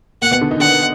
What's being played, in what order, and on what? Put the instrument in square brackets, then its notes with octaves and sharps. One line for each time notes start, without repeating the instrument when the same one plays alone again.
[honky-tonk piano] A#2 A#3 [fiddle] F#5
[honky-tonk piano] B2 B3
D3 D4
D#3 D#4
[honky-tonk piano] D3 D4 [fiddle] F#5